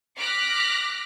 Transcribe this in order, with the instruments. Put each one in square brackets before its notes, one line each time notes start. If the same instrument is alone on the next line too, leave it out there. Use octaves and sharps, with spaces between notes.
[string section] D6 F6 F#6 A#6 B6